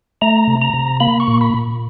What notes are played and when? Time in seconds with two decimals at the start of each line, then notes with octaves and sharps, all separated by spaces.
0.21 A3 A#5
0.47 C3
0.62 A#5
0.74 C3
1.00 A#3 B5
1.20 C#6
1.28 A#2
1.41 B5
1.54 A#2